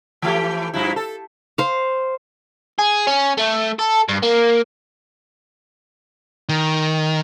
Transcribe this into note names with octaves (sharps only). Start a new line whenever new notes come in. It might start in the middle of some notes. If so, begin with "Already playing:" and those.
E3 A3 G4
G2 F3 E4
A4
C5 F5
G#4
C#4
A3
A4
G2
A#3
D#3